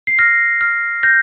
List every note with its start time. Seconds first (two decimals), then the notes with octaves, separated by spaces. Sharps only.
0.07 C7
0.19 F6 A#6
0.61 F6
1.03 G6 A#6